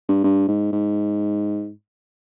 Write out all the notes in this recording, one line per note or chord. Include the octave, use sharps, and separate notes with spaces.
G2
G2
G#2
G#2